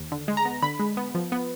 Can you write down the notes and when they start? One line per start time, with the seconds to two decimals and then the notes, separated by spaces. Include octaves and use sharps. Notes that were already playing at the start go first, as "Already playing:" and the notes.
Already playing: D#2
0.12 D3
0.28 G#3
0.37 A#5
0.45 B3
0.63 D3 B5
0.80 G#3
0.97 B3
1.15 F3
1.32 B3